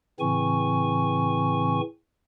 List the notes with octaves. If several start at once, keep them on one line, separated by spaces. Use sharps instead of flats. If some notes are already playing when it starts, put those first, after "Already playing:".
A2 C#3 E3 C4 G#5 C#6